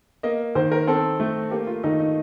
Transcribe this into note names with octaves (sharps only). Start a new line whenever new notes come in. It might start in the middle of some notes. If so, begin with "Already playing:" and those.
A#3 D#5
D#3 C5
A#4
C4 A4
A3
A#3 G4
F4
D#3 D#4
D#4